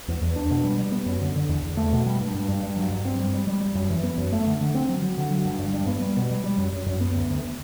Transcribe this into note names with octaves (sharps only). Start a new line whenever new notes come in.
E2
E2
D4
B2
G3
G3
B3
F#2
D3
D3
E2
E2
A3
B2
G3
G2
G2
G2
G2
F#3
G2
C4
G3
G3
G3
G3
F#2
E3
B3
F#2
A3
D3
D3
C4
F#3
F#3
D3
F#3
G2
G2
G2
B3
G3
B2
G3
G3
F#2
F#2
F#2
B3
D2
D2